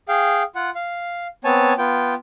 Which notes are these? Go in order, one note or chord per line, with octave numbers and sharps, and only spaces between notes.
G#4 F5 G5
F4 F#5
F5
B3 C4 C#5 G#5 A5
B3 F4 G5